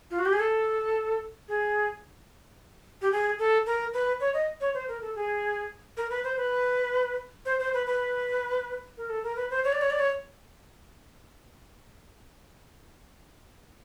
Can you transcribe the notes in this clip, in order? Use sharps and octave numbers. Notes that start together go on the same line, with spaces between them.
F4
F#4
G4
G#4
A4
G#4
G4
G#4
A4
A#4
B4
C#5
D#5
C#5
C5
A#4
A4
G#4
A#4
B4
C5
B4
C5
C5
B4
B4
A#4
A4
A#4
B4
C5
C#5
D5
C#5
D5
C#5